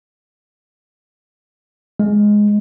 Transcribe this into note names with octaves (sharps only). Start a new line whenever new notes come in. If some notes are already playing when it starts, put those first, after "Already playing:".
G#3